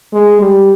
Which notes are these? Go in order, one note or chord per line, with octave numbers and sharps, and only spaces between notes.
G#3
G3